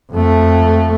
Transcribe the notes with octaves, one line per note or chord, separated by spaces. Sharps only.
F2 A3